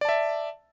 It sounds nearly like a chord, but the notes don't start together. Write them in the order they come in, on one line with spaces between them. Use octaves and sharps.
D5 A5 E5